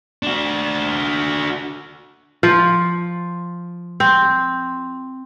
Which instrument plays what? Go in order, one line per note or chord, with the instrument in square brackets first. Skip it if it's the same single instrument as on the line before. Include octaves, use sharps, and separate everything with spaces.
[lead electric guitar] D4 F#4
[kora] F3
C4